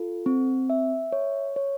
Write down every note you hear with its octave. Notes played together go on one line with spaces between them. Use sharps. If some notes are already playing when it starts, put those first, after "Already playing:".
Already playing: F4 A4
C4
E5
C#5
C#5